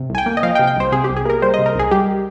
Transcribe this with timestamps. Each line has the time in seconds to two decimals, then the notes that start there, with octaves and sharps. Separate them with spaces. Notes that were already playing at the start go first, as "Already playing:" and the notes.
Already playing: C3
0.10 C2 G#5
0.18 G5
0.26 A#3
0.37 D#5
0.43 F3 F5
0.55 G5
0.59 C3
0.67 G5
0.76 C2 C5
0.92 C3 G#4
1.04 G4
1.09 C2
1.17 G#4
1.25 A#3 A#4
1.42 G3 C5
1.54 D#5
1.59 C3
1.66 A#4
1.75 C2 G#4
1.91 G3 G4